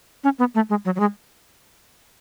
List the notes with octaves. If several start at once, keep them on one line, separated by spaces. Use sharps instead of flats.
C#4
B3
A3
G#3
F#3
F#3
G#3